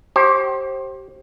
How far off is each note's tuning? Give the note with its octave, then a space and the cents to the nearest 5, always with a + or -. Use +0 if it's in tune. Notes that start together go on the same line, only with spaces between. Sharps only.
G4 -25 C5 +30